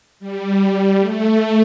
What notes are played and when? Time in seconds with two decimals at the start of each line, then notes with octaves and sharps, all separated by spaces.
0.20 G3
1.00 A3